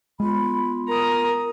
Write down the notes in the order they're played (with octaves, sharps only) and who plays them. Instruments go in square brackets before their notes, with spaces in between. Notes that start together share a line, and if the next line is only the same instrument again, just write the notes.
[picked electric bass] G#3 [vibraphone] B3 F4 C6 [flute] B5
[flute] A#4 [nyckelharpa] A#5 D#6